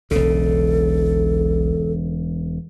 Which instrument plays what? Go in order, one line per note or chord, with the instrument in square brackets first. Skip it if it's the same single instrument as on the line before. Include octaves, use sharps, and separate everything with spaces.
[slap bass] E1 C#3 [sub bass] B1 [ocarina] A4